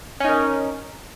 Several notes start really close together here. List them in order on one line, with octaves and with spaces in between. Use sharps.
C#4 D#4 A#4